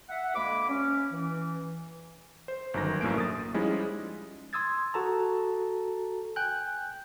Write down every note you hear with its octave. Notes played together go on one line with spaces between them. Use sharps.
E5 F#5
D2 G#3 A#3 B5 D6
C#4
E3
C5
G1 F#2 D#3 A#6
A#1 F#2 A2 A#3 D7
D#6 A6
F3 G3 G#3 C#4 D#4 E4
C6 D#6 E6 G#6 A6
F#4 A4 A5 A#5
G5 G#5 F#6 G6